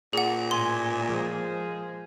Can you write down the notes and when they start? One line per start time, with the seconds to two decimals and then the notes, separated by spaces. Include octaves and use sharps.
0.13 A#2 G#4 F#5
0.51 A2 G#5 C6
1.08 F3 G#3 A#3 G#4 C5